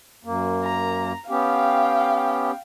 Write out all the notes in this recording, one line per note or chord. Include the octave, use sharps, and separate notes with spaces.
F#2 A#3
A#5
B3 C#4 G4 F5 G5